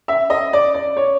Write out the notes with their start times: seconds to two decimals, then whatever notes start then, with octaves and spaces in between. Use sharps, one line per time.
0.08 E5
0.30 D#5
0.53 D5
0.74 D5
0.97 C#5